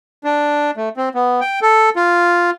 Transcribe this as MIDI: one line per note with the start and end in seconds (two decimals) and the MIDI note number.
0.24 0.71 62
0.77 0.89 57
0.97 1.09 60
1.15 1.40 59
1.41 1.60 79
1.62 1.89 69
1.96 2.51 65